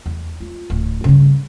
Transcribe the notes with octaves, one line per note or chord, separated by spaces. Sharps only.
E2
F4
D1
G2 C#3